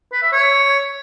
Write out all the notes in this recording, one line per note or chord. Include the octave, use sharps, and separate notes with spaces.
B4
E5
C#5